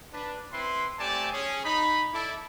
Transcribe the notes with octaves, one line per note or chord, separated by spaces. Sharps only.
D4 B4
C4 E4 B4 C6
A3 C4 G4 D5 G#5 A5
C#4 G#4
D#4 B5
E4 A4 D5